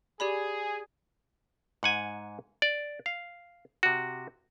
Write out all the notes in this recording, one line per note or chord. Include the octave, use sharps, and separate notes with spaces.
G4 G#4 D5 B5
G#2 F#5 G#5
D5
F5
C3 F#4